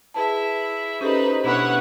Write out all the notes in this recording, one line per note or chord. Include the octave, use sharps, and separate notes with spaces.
E4 G#4 B4 E5 A5
C#4 D#4 G4 A4 B4 C5
B2 B3 D4 E4 B4 C#5 F#5